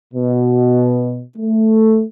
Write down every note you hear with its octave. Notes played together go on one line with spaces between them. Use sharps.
B2
A3